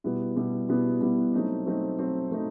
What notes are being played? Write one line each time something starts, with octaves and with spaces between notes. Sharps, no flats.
B2 G3 B3 E4
B2 G3 B3 E4
B2 G3 B3 E4
B2 G3 B3 E4
F#3 A3 C4 D#4
F#3 A3 C4 D#4
F#3 A3 C4 D#4
F#3 A3 C4 D#4